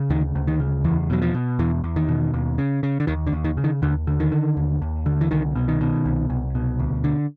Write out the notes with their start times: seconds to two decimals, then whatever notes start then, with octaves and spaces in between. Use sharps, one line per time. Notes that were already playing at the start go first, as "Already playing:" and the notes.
Already playing: C#3
0.10 D2 D#3
0.35 D2
0.48 D#3
0.60 C#3
0.84 E2 E3
1.10 B2 F#3
1.22 F3
1.34 B2
1.59 E2 E3
1.84 E2
1.96 D#3
2.09 B2
2.34 D#2
2.58 C#3
2.83 C#3
3.00 D3
3.07 D#2 D#3
3.27 D3
3.32 D#2
3.44 D#3
3.57 C#3
3.64 D#3
3.82 D#2 D3
4.07 D3
4.20 D#3
4.32 D3
4.57 D#2
4.82 D#2
5.06 D3
5.21 E3
5.31 C2 D#3
5.55 B2
5.68 D#3
5.81 B2
6.06 C2
6.30 C2
6.55 B2
6.79 D2
7.04 D3